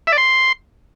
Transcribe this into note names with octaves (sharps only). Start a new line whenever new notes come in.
E5
D5
C6